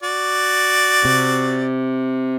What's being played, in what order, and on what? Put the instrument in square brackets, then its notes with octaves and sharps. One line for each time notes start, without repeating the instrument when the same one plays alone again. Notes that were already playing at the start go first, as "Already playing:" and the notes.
[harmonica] F#4 D5
[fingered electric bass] C3